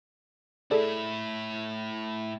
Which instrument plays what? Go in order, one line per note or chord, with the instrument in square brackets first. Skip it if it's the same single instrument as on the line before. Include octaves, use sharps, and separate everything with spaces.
[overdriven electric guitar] A2 E4 [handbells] G#4 A4 D5